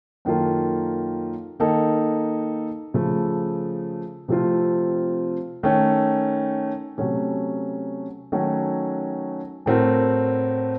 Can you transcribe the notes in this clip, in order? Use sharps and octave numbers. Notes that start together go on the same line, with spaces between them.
F#2 D#3 A#3 F4 A4
D#3 A#3 D#4 A4
C#3 F3 A3
C3 F3 A3 C4 F4
D#3 A3 C#4
C3 F#3 A3 C#4
D#3 F#3 A3 C#4 F#4
A2 A3 C4 F#4 A#4